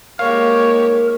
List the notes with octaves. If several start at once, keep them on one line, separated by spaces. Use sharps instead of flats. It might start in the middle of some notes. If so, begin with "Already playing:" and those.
G#3 A#3 D#4 G4 A#4 C#5 F5